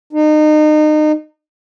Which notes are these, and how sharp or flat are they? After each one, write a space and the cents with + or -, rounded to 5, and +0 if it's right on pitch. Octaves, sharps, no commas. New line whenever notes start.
D#4 -30